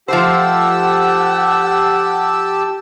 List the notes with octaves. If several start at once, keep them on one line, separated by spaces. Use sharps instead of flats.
F3 A3 G4 C5 F#5 A5 E6